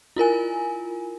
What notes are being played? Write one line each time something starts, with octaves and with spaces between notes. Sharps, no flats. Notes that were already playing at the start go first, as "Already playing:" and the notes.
E4 F4 A#4 G#5